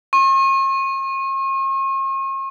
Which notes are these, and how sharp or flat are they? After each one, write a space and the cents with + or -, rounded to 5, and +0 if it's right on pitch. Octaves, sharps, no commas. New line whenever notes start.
C#6 -45